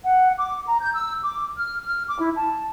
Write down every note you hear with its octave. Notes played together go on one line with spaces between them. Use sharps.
F#5
D6
A#5
G6
E6
D6
F6
F6
D6
E4
A5